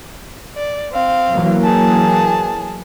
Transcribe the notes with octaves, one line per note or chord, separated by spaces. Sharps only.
D5
C4 F5
E3 F#3 A#3
G#4 A5